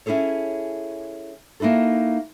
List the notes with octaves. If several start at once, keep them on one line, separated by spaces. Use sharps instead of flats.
C#4 E4 G#4 A4 C#5
A#3 D#4 E4 F#4 A4